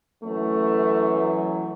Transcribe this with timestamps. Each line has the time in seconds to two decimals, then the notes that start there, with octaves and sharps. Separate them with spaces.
0.22 F#2 E3 A3
1.16 F#3